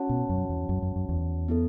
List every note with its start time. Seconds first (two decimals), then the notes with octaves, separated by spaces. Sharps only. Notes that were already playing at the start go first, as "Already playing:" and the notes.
Already playing: C#4 F#4 C#5 F#5 A5
0.09 B2
0.29 F#2
0.49 E2
0.69 F#2
0.82 F#2
0.96 F#2
1.09 E2
1.48 B3 E4 A4